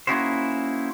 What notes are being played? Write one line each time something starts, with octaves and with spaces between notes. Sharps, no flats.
A#3 C#4 D#4 E4 F#4 C5